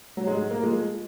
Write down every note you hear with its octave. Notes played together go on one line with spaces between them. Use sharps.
F#3
G#2 G#3
A#3
F3 G#3